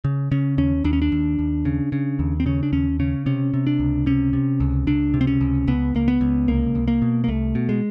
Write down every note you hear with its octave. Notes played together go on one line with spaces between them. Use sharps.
C#3
C#3 C#4
D#2 C#4
D#2 D4
C#4
D4
D#2
D#2
C#3
C#3
D#2
C4
C#3 C#4
D4
D#2 C#4
C#3 C#4
C3 C#4
C3
D4
C#2
C3 C#4
C3
C#2
C#2 D4
C3
C4
C#4
C#2
C#2 B3
C#2 A#3
B3
C#2
C2 A#3
C2
A#3
B2
A#3
C2 A3
B2
G#3